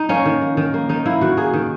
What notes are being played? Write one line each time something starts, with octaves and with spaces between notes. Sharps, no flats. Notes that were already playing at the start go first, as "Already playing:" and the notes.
Already playing: D#4
A#3 C#4
D#3
A#3
D#3
A#3
D#3 D#4
A#3 E4
D#3 F#4
A#3 G#4
D#3